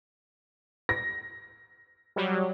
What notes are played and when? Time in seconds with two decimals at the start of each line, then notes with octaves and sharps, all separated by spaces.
0.89 A#6
2.16 F#3 G3